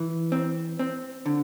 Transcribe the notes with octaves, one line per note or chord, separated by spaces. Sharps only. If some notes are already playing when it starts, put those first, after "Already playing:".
Already playing: E3
C4
C4
D3